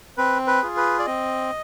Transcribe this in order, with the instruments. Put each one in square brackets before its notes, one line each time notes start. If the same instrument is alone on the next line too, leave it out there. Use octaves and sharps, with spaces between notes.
[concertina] C4 B4
B4
F4 G#4
B4
D5
C4 D#5